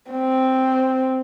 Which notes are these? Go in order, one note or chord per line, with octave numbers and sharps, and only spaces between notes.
C4